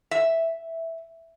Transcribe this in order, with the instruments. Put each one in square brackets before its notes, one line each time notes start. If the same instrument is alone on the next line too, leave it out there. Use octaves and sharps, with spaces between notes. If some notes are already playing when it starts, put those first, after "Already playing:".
[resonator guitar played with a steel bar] E5